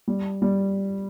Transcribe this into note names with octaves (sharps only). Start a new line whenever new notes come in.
G3
G3